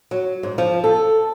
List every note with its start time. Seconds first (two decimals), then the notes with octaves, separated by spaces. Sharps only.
0.11 F#3
0.43 G#2
0.58 F3
0.84 A4